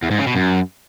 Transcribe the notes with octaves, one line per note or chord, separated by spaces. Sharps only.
E2
G#2
C#3
B2
F#2